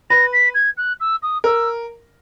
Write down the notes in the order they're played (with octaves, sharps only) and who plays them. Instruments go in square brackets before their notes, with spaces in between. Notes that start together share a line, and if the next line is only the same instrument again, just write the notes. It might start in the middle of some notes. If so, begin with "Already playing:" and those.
[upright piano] B4 [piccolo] A#6
[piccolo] B6
G#6
F#6
E6
D#6
[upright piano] A#4 [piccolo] E6